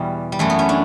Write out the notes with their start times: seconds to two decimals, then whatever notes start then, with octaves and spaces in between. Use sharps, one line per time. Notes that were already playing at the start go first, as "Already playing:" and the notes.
Already playing: E2 B2 G3
0.32 G3
0.39 F#2 E3 A3
0.50 B3
0.59 C#4
0.69 D4